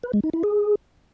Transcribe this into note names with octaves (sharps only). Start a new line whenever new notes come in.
B4
G#3
D#4
E4
G#4